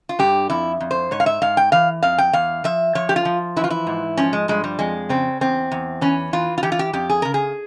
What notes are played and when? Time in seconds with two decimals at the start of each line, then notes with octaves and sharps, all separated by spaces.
0.09 F4
0.19 G2 G4
0.50 F2 E4
0.80 F2
0.91 C5
1.11 G#2 C#5
1.20 F5
1.26 E5
1.42 G#2 F5
1.57 G5
1.72 E3 F5
2.03 F2 F5
2.18 G5
2.33 E2 F5
2.64 F3 E5
2.95 F3 C#5
3.09 G4
3.16 F4
3.25 F3
3.56 E3 E4
3.64 F4
3.70 E4
3.87 G#2
4.17 F3 C#4
4.33 G#3
4.48 G2 G#3
4.64 G3
4.79 F2 G#3
5.09 C#3 C4
5.41 E2 C4
5.71 E2
6.01 E3 C#4
6.33 E3 F4
6.58 F4
6.63 E3 G4
6.72 F4
6.79 G4
6.93 F2 G4
7.10 G#4
7.22 C#3 A#4
7.34 G#4